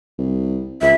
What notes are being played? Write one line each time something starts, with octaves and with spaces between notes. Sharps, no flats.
C2
C#2 E5